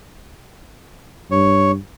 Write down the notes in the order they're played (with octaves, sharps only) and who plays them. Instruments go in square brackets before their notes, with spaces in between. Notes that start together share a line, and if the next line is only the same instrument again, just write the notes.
[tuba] G2 [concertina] C#5